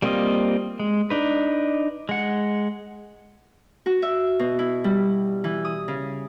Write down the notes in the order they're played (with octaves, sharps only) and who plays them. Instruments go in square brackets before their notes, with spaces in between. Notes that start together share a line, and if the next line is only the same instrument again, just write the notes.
[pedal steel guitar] G3 A#3 C4 F4 D#5
G#3
D4 D#4 B4
G#3 F#5
[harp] F#4
E5
B2
E4
G3
E3
D#6
C#3